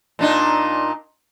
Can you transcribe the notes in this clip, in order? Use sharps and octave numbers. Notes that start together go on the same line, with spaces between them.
A#2 D4 D#4